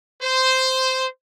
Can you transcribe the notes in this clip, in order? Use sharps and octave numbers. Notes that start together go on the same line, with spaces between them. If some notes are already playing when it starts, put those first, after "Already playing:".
C5